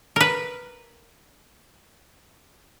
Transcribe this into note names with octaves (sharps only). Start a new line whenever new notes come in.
A#4 B4